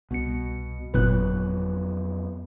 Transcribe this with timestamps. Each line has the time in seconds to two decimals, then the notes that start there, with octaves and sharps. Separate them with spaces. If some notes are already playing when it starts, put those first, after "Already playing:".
0.11 C2 B2 B3 C#7
0.94 G1 F2 A#2 F#3 B3 B4 F#6